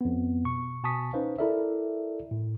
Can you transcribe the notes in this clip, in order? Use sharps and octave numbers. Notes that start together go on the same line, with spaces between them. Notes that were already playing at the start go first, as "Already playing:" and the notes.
F2 B3
B2 C#6
B2 G#5 A5 C#6 D#6 B6
C#4 D#4 B4 C5 F5
E4 A4 A#4 D5 E5
A2